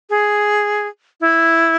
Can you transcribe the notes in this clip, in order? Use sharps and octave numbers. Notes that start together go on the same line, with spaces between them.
G#4
E4